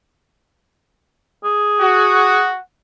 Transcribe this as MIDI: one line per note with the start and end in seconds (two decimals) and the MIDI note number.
1.44 2.47 68
1.80 2.60 66